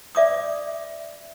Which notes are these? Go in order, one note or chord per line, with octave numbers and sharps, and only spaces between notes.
D5 E5 D6 D#6